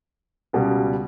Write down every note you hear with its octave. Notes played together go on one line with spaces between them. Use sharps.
C#2 B2 G3